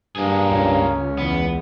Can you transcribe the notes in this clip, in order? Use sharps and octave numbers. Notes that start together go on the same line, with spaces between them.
G2 A#3 G#4
C#2 C#4
E2 B3